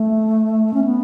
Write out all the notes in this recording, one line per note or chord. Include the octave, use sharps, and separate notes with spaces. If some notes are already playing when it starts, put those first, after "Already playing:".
Already playing: A3
C#4
B3